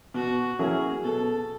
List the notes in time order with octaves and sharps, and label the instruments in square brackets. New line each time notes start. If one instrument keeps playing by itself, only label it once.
[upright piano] B2 [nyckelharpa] F#4
[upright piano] F#3 A#3 C#4 E4 [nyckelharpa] G#4
[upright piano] B2 [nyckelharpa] A4